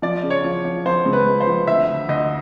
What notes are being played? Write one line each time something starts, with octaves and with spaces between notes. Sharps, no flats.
F3 D5
C#3
C#5
F3
F3
F3 C5
C#2
B4
C#2
C5
F3
D2 E5
D2
D2 D#5